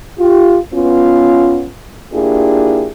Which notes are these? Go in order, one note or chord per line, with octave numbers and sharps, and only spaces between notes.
F4 G4
B3 C#4 F4
A#3 D4 E4 F4 G4 G#4